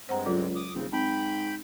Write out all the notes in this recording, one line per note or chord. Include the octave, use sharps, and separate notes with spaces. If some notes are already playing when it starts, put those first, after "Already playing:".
G2 G#3 C4 C5 F#5 A#5
C#2 F#3 F4 A4
D6 D#6
D#1 C#3 C4
G#2 C4 G5 B5